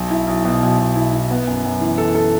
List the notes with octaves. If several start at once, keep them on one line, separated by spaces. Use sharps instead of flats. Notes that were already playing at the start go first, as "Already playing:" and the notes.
Already playing: B1
E4
B1
B2
B1
B2
E4
E4
B3
F#2
F#2
E3
A4
A4